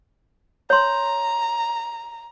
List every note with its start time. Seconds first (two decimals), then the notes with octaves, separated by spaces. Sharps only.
0.70 C#5 A#5 C6